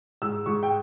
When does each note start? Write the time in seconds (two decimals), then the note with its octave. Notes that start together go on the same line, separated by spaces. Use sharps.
0.22 G#2 E6
0.46 G#2 C#6
0.63 G5